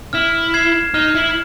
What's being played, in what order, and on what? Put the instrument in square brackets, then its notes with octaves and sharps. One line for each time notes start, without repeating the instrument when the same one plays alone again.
[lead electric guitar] E4 [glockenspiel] F6
[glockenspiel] G#6 C7 E7
[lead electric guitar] D#4 [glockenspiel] F6
[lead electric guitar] E4